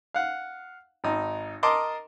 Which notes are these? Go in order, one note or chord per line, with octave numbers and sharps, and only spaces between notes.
F5 F#5
G#1 D#4
A#4 D#5 A5 C6 D6